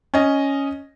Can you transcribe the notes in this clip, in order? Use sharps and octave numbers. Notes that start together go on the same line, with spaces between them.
C#4 D#5